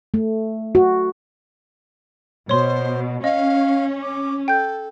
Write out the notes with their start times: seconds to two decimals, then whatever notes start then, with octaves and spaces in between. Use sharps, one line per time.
0.14 A3
0.75 F#4
2.49 B2 C5 C#5 C6
3.24 C#4 D#5 F5
4.02 D6
4.48 A4 G5 G6